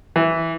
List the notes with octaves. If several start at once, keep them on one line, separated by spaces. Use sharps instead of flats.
E3